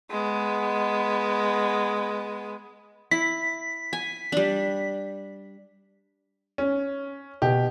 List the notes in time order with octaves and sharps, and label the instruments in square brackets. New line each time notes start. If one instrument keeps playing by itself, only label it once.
[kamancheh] G#3 B3
[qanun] E4 [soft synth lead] B6
[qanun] G#5
G3 D4
[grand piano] C#4
[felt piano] B2 [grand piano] G4